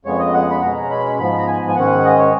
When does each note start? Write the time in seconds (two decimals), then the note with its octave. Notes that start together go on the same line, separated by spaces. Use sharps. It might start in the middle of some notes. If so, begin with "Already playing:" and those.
0.05 F2 C#3 G#3 B3 C#5
0.19 D#5
0.34 F#5
0.51 B5
0.62 B2 G#3 C#4 A#5
0.90 B5
1.19 G#2 F3 B3 B5
1.38 A#5
1.48 G#5
1.68 G#5
1.76 G#2 D#3 G#3 C#4 F#5
2.05 D#5
2.18 C#5